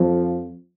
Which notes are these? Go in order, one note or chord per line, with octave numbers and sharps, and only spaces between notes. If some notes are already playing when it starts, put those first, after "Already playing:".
Already playing: F2 F3